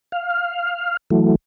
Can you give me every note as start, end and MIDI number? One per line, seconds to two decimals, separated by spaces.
0.12 0.97 77
1.10 1.35 52
1.10 1.35 54
1.10 1.35 57